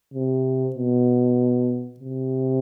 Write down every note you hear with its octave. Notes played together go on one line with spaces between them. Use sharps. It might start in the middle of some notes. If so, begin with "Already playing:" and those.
C3
B2
C3